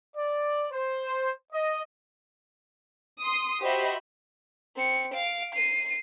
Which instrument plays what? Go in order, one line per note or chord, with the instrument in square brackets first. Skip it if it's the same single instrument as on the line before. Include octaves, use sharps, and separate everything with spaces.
[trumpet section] D5
C5
D#5
[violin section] C6 D#6
F#4 G4 C5 D#5 E5 B5
[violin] C4 C#7
F5 D7
C7 D#7